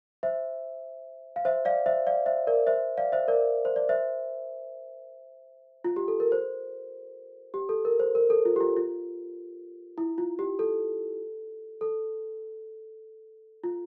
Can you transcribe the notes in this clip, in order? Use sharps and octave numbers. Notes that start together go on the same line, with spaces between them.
C5 E5
F5
C5 E5
D5 F5
C5 E5
D5 F5
C5 E5
A#4 D5
C5 E5
D5 F5
C5 E5
A#4 D5
C5
D5
C5 E5
F4
G4
A4
A#4
C5
G4
A4
A#4
C5
A#4
A4
F4
G4
F4
F4
E4
F4
G4
A4
A4
F4